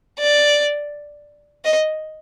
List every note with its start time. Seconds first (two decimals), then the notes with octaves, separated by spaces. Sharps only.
0.19 D5
1.65 D#5